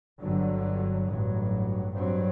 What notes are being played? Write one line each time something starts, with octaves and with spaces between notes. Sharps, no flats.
G1 G2 D3 F#3
A1 G2 F#3
G2 F#3 C4